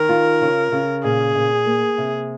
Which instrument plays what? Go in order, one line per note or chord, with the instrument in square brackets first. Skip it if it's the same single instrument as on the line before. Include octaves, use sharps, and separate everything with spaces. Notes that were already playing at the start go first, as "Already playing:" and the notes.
Already playing: [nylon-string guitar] D#3 [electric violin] A#4
[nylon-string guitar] F4
C#3
C#3
[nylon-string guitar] A#2 [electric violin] G#4
[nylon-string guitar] A#2
A#3
C3